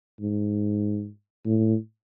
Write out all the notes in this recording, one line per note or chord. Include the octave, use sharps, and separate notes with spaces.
G#2
A2